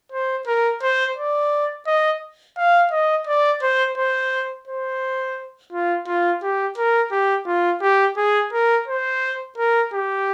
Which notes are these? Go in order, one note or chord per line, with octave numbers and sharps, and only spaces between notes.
C5
A#4
C5
D5
D#5
F5
D#5
D5
C5
C5
C5
F4
F4
G4
A#4
G4
F4
G4
G#4
A#4
C5
A#4
G4